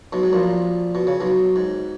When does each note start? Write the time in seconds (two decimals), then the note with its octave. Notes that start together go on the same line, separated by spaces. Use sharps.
0.13 B1 B2
0.23 G#2
0.33 A#1 A#2
0.95 B2
1.07 C#3
1.20 B1 B2
1.56 G#2